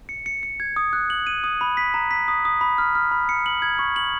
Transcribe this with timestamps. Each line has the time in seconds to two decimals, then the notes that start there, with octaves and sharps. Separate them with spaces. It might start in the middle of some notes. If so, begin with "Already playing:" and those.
0.09 C#7
0.26 C#7
0.43 C#7
0.60 G#6
0.76 D#6
0.93 F#6
1.10 F#7
1.27 D#7
1.44 D#6
1.61 B5
1.77 B6
1.94 A#5
2.11 B6
2.28 D#6
2.45 D#6
2.61 B5
2.78 F6
2.95 F6
3.11 B5
3.29 C#7
3.46 F#7
3.62 G#6
3.79 C#6
3.96 F#7